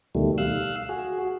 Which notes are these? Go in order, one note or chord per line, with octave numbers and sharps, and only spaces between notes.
D2 B2 D#3 G3 A3
F5 E6 F#6
F#4 G#4